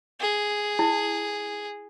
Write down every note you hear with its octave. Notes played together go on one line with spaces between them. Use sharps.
G#4
E4